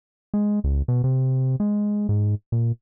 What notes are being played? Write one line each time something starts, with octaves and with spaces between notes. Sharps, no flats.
G#3
C#2
B2
C3
G#3
G#2
A#2